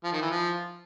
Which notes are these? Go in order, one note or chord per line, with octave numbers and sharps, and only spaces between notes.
F3
D#3
E3
F3